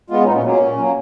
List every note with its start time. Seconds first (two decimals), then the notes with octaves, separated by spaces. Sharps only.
0.10 G#3 B3 F4
0.21 C#4
0.27 A#2 D#4
0.36 C#4
0.44 F#3 B3
0.47 A#3
0.52 C#4
0.60 A#2
0.78 F#3 A#3